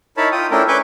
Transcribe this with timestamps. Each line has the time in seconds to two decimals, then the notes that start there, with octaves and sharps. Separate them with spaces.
0.17 D#4 E4 A#4 C#5 A5 B5
0.32 F4 G5 D#6
0.51 A3 C#4 D4 E4 A#4 G5
0.68 C#4 B4 G#5 C#6 D6 G6